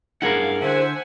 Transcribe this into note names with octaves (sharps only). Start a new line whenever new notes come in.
G2 E4 G#4 A#4 F5 F#5
D3 C5 E5 F#5 G#5